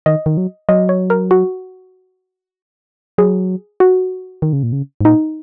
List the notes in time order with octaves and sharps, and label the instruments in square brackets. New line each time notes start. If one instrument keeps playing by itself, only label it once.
[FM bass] D#3 [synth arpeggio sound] D#5
[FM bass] D#3
F#3
[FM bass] F#3 [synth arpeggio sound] D#5
[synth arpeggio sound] C#5
A#4
F#4
[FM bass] F#3 [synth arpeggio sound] G#4
[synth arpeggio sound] F#4
[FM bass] D#3
C#3
A#2
C#3
G#2
[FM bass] A#2 [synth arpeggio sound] D#4